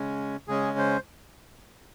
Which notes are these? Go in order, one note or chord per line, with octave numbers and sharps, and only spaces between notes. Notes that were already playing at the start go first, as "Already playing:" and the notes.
Already playing: C#3 G#3 C#4
C#3 G#3 C#4 G#4
C5